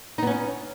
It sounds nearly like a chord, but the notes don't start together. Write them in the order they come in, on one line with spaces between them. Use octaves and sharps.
D#4 B3 C#4